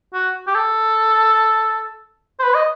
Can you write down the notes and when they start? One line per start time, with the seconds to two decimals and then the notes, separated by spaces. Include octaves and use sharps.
0.14 F#4
0.47 G4
0.55 A4
2.39 C5
2.43 B4
2.54 D#5